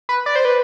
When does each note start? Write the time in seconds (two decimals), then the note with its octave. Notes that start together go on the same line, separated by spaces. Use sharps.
0.09 B4
0.26 D5
0.36 C5
0.45 B4